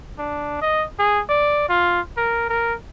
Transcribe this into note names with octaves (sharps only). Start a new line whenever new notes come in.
D4
D#5
G#4
D5
F4
A#4
A#4